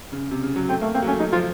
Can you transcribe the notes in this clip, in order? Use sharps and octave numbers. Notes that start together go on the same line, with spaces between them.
C#3
C3
C#3
F#3
A3 C4
A3 A#3
A#3 C4
F#3
A3 C#4
F#3 D#4
F3 F4